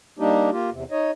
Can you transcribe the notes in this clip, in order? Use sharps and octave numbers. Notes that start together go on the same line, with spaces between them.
G3 A#3 D4 D#4 G4
A#3 F4 G4
E2 C3
D#4 C#5 D#5